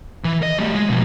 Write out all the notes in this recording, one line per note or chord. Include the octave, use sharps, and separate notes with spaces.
E3
D#5
G3 A3
G#3
B2 F3